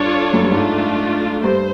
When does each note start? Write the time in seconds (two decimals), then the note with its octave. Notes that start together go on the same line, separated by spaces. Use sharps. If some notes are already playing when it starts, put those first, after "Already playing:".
Already playing: G2 D4 F4 A4 C#5
0.33 F#2
0.43 G2
0.51 G#2 A3 D4 F4
1.43 G2 C5